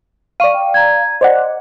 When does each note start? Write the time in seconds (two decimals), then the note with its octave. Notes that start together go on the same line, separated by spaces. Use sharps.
0.40 D5 F5 C#6 D#7
0.54 G5
0.74 A#5 G#6
1.21 C5 D5 D#5 F#5